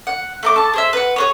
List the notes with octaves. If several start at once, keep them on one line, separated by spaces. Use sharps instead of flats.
F#5
A3 A#5 D6
A4 A5
G#4 C5 E5
B4 F#5
G#4 C5 C#5